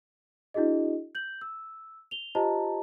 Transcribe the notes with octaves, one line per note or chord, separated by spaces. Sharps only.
D4 E4 F#4 G#4 D#5
G6 F#7
E6
F7 G7
F4 G4 C5 D#5 A5 A#5